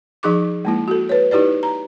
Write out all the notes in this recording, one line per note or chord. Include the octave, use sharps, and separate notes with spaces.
F3 D#4 G#4 C#6 D6
G#3 A#3 E4
F#4 A4
B4 C#5
D#4 E4 G4 B4 D5
A#5